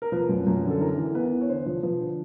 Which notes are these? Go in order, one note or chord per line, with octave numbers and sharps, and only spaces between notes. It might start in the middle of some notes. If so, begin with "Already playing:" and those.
A#4
F3 B4
F#2
F#2
D3
A4
E3 A#4
E3
B3 B4
E3
C#5
D3 C5
F3
F3 B4
D3